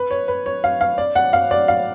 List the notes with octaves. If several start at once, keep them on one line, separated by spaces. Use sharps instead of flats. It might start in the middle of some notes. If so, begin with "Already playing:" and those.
Already playing: B4
C#5
B4
C#5
F5
F5
D5
F#5
F5
D5
F5